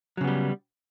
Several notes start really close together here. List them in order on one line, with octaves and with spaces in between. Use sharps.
F#3 C#3 B3 G3